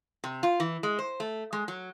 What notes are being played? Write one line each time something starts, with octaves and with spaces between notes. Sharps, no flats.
C3
F4
E3
G#3
C5
A3
G#3
F#3